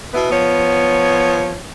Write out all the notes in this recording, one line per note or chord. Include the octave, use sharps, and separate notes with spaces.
B2 B3 E4 B4
F3 B3 C#5